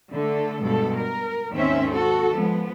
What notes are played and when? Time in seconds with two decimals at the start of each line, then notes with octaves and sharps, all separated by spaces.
0.11 D3 A3 A4
0.62 G2 B2 G#3 A4
0.99 A#4
1.53 D#2 G#2 D#3 C4 C#4 E5
1.92 F#4 A4
2.31 F3 G#3 B3